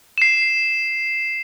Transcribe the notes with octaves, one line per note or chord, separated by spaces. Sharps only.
C7 E7